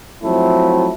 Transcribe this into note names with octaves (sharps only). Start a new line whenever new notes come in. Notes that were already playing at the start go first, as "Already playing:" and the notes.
F3 F#3 A3 C4 E4